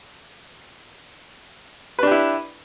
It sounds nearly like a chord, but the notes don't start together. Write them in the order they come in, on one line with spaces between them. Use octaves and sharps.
B4 D4 G4 E4